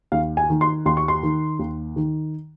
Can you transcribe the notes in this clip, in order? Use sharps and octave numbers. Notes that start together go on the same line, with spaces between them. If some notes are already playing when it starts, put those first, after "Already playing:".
D#2 F5
G#5
D#3
C6
D#2 C6
C#6
C6
D#3
D#2
D#3